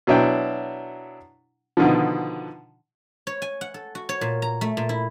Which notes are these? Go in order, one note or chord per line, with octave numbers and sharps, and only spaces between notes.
B2 F#3 D4 E4 G5
B2 D3 D#3 F3
C#5
G#5
F#5
A4
F#4
C#5
A#2
A#5
A3
A#2
E4